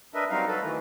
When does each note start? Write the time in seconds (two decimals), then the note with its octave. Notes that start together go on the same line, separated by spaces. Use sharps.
0.14 D4 A#4 B4 D#5 E5
0.30 F#3 G3 C4 D#4 A#4 F5
0.48 F#3 A4 B4
0.61 D#3 E3 A3